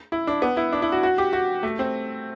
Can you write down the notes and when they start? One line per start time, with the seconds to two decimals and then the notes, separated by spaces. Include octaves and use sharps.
0.12 E4
0.27 D4
0.42 B3
0.57 E4
0.72 D4
0.82 E4
0.92 F#4
1.03 F#4
1.18 G4
1.33 F#4
1.63 A3
1.79 C4